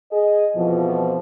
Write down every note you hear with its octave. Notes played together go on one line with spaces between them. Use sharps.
G#4 D#5
F2 B2 E3 F3